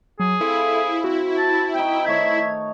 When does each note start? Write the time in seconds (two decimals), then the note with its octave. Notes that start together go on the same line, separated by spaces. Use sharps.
0.20 F#3 G#4
0.41 C4 E4 F4 A4
1.04 C4 F#4
1.38 A5
1.75 C4 D#4 G5
2.06 D#3 A3 C#5 E5 G#6